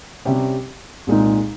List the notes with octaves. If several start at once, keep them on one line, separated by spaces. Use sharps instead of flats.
C3 G3 C#4 G4
C2 A#2 G#3 D#4